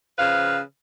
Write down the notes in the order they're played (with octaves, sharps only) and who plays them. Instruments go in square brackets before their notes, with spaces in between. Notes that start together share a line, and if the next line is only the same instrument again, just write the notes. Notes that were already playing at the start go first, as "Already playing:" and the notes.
[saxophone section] C#3 F3 B4 F5